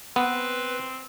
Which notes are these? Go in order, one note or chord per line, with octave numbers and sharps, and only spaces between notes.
B3 C4 B4